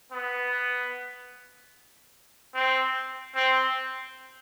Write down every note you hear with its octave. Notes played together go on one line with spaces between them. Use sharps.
B3
C4
C4